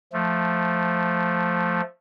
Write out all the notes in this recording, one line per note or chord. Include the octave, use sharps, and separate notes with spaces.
F3 A3